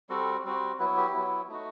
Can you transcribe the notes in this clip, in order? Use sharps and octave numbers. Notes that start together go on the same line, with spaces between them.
G3 C4 F#4 A4
G3 C4 F#4
F#3 B3 E4 B4
G4
F#3 B3 E4
A3 D#4 F#4